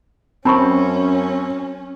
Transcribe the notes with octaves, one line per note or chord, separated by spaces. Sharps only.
F#2 C4 C#4 A5 B5 C#6